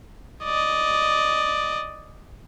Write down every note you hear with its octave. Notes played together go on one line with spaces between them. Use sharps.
D5 D#5